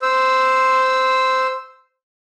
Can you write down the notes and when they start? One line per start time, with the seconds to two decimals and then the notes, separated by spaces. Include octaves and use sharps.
0.02 C5 E6